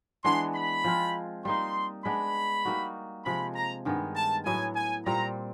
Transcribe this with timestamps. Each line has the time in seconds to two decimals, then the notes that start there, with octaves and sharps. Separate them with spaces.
0.24 E3 G#3 B3 D4 C6
0.55 B5
0.84 F3 G#3 C4 F4
1.45 G3 A#3 D#4 C6
2.05 G#3 B3 D4 B5
2.65 G3 A#3 D#4 F#4
3.25 C3 F3 G#3 B5
3.55 A#5
3.85 G2 D#3 G#3 B3
4.16 A5
4.45 A2 F#3 B3 E4 G#5
4.75 G#5
5.06 A#2 G3 C4 A#5